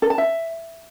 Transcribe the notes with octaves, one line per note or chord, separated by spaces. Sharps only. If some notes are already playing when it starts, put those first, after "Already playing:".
A4
A5
E5